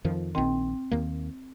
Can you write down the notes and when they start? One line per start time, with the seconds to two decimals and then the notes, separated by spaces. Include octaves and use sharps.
0.04 F2 D#3 F3
0.35 A#1 D#3 C4 G5
0.91 D#2 D#3 A#3